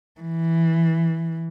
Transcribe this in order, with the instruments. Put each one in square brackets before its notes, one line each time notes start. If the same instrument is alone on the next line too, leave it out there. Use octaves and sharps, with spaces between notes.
[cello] E3